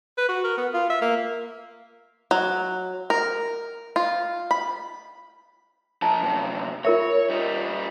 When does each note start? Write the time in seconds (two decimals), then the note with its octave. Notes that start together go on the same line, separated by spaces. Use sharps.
0.18 B4
0.29 F#4
0.44 A#4
0.58 B3
0.74 F4
0.89 E5
1.02 A#3
2.31 F#3
3.10 A#4
3.96 F4
4.51 B5
6.02 F3 A#4 A5
6.22 F#2 C3
6.85 F4 A#4 C#5 E5
7.29 G3 D#4